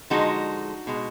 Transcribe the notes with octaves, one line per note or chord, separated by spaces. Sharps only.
D3 F3 G#3 D#4 F#4
B2 G#3